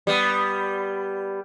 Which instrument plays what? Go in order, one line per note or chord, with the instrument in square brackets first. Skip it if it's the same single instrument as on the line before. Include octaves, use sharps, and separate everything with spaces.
[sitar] G3 B3